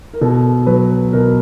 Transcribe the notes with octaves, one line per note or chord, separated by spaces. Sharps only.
A#4
B2 A4
F#3 B4
B2 A#4